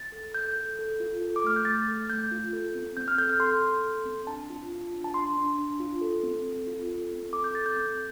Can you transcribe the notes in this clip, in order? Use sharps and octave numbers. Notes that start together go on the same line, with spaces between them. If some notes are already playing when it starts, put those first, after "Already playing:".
Already playing: A6
A4
A4 G6
A4
A4
F4
A4
D6
A3 F6
G6
A3 A6
A4
A3 G6
F4
A4
C4
C4 G6
F6
A4 G6
F6
A4 C6
A4
A4
C4
D4 A5
F4
F4
D4
A5
D4 C6
D4
D4
F4
A4
C4
A4
F4
A4
C4
A4 D6
G6
A4 A6
G6
C4 G6